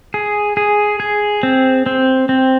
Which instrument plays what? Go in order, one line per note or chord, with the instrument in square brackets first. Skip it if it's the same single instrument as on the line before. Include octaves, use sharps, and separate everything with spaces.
[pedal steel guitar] G#4
G#4
G#4
C4
C4
C4